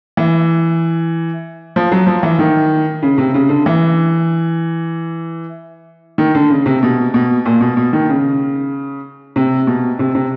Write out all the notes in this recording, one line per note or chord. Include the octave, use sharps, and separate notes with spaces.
E3
F3
F#3
F3
E3
D#3
C#3
C3
C#3
D3
E3
D#3
D3
C#3
C3
B2
B2
A#2
B2
B2
D#3
C#3
C3
B2
C3
C3